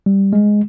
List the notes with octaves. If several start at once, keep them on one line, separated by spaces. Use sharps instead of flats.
G3
G#3